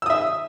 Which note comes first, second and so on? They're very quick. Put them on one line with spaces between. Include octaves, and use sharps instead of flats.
E6 D#6 E5